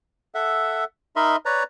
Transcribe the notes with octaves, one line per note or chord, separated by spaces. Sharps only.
A4 E5 F#5
D#4 A#4 D#5 E5 B5 C6
B4 C#5 D5 A#5